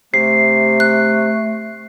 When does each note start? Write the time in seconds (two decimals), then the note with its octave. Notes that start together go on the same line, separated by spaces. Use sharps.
0.14 C3 A3 C7
0.80 F#6